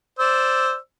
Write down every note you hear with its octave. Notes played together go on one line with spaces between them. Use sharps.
C5 D5 E6